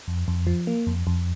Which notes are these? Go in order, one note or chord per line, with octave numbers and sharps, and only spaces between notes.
F2
F2
F3
A#3
F2
F2